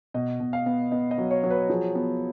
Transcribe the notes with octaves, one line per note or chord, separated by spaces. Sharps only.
B2 D#5
B2
F5
B3
B3 D#5
D#5
F#3
C#5
F#3
B4
F3 G#4
B3